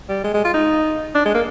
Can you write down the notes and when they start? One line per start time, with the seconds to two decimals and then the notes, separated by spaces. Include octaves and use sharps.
0.09 G3
0.24 G#3
0.34 G#3
0.45 F4
0.54 D#4
1.15 D4
1.25 G#3
1.35 A#3